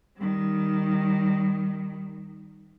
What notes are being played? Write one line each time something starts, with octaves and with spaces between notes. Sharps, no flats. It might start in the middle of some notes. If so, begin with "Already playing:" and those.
D#3 G3